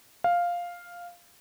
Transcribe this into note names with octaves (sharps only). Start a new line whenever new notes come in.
F5